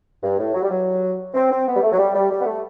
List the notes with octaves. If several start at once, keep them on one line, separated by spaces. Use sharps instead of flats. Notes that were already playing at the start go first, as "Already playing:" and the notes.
G2
A2
F#3
G3
F#3
C4
C4
B3
G3
A3
F#3
G3
G3
G3
B3
A3